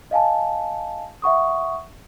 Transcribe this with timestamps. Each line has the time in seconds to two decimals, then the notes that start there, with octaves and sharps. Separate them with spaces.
0.11 D#5 F5 G#5 A5
1.22 E5 F#5 C#6 D#6